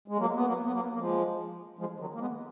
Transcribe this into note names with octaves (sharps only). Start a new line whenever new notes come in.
G#3
F#3 A#3
B3
F#3 A#3
B3
F#3 A#3
A#3
F3 G#3
F3 G#3
D#3 F#3
A#3
G#3 B3